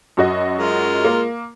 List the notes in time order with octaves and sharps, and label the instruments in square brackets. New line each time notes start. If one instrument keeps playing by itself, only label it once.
[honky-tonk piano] F#2 F#4 D#5
[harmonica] G#3 F4 A#4
[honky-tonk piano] A#3